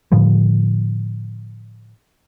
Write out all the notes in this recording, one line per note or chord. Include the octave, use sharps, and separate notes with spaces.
A2 D3 F3 G3